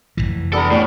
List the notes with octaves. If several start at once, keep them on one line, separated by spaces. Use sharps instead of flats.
F1 C#2 E3
B3 D4 G4 A4 A#5
A2 G3 B3 C#4